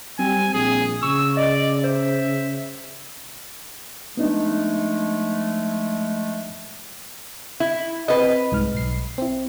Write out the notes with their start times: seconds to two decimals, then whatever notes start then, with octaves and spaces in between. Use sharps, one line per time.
0.19 G3 C4 G#5
0.54 A#1 G#4
1.03 C#3 C#6 E6
1.37 D5 D#5
1.84 C5 E5
4.17 F3 G#3 A3 B3 D4 D#4
7.60 E4
8.08 C4 B4 D#5
8.52 C2 G#2 F6
8.74 B1 C7
9.18 C4 E4